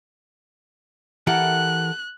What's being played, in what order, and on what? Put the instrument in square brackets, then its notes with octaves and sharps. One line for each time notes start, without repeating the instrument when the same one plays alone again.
[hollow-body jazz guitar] E3 E4 G4 [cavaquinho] A4 A#4 F#5 [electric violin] F#6